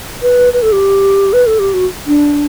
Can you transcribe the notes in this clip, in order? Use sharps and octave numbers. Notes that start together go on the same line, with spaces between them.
B4
B4
A4
G4
B4
A4
G4
F#4
D4